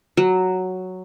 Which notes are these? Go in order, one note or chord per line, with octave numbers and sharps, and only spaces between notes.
F#3